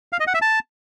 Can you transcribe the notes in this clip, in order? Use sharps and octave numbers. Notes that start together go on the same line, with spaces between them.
F5
D#5
F#5
E5
A5